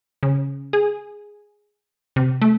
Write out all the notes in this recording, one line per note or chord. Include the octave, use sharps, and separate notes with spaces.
C#3
G#4
C3
A3